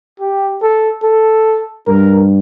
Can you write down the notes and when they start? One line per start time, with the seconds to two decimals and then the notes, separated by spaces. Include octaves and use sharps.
0.20 G4
0.62 A4
1.03 A4
1.87 G2 A#4